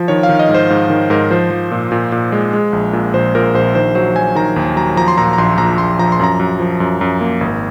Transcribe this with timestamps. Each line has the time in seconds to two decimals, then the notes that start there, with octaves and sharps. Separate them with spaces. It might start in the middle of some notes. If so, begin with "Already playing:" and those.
Already playing: F3
0.08 D#3 C#5
0.23 F5
0.29 D#3
0.39 D#5
0.49 G#2
0.54 C5
0.70 G#2
0.90 D#3
1.10 G#2 A#4
1.31 F3 C5
1.51 F3
1.71 A#2
1.92 A#2
2.12 A#2
2.32 G#3
2.53 G#3
2.73 A#1
2.93 A#2
3.13 A#1 C5
3.35 A#2 A#4
3.54 A#1 C5
3.75 D#3 C5
3.95 F#3 C5
4.15 F#3 G#5
4.35 D#3 A#5
4.56 D#2
4.76 F#3 A#5
4.97 F3 A#5
5.08 C6
5.18 A#2 A#5
5.33 A#5
5.38 A#1 C6
5.58 A#1 A#5
5.78 A#1 C6
5.99 F3 A#5
6.12 C6
6.20 F#2 A#5
6.40 F#2
6.59 F3
6.80 F#2
7.01 F#2
7.21 A#3
7.41 G#1